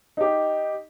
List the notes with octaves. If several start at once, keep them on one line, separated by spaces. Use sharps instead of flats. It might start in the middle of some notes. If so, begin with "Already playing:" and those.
D#4 G4